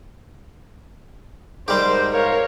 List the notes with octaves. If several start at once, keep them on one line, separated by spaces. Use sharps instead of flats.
G#2 G3 G4 A#4 C5
A#4 C#5 F5